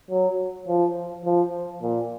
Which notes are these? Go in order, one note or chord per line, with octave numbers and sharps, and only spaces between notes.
F#3
F3
F3
A#2